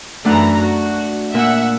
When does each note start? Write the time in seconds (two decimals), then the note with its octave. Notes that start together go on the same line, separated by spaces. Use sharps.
0.25 F#2 E3 A3 D4 F#5 A#5
0.59 F#4
1.34 A#2 E5 F#5 E6